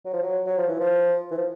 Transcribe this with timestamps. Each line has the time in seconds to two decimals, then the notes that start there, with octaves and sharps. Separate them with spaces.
0.05 F#3
0.13 F3
0.22 F#3
0.47 F#3
0.58 F3
0.69 E3
0.80 F3
1.31 E3
1.38 F3